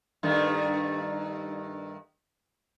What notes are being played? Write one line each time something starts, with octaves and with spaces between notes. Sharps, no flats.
G2 D#3 A3